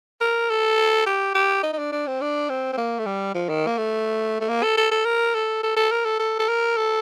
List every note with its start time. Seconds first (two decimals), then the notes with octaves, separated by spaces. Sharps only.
0.21 A#4
0.50 A4
1.06 G4
1.35 G4
1.63 D#4
1.73 D#4
1.79 D4
1.92 D4
2.07 C4
2.21 D4
2.49 C4
2.73 C4
2.77 A#3
2.99 A3
3.06 G3
3.35 F3
3.49 D#3
3.67 A#3
3.78 A3
4.41 A3
4.49 A#3
4.63 A4
4.77 A4
4.91 A4
5.06 A#4
5.35 A4
5.63 A4
5.76 A4
5.92 A#4
6.05 A4
6.19 A4
6.39 A4
6.49 A#4
6.77 A4